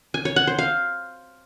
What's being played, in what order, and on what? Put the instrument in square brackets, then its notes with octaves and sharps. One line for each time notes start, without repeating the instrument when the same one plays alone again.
[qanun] G#5
C#5
F#5
C5
F5